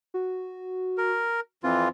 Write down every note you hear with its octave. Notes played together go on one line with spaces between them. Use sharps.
F#4
A#4
F2 E3 C4 F4